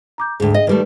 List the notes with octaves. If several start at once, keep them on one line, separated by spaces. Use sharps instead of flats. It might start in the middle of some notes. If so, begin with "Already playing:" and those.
A#5 D6 G6
D2 G#2 G#4 G5
D#5
D#3 G3 A3 D#4 B4 D5